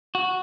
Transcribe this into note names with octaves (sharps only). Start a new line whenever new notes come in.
F#4